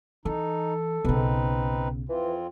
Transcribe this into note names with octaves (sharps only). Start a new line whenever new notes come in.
E3 D#4 A4
B1 C#3 C4 D#4 B4
F2 E3 C4 F4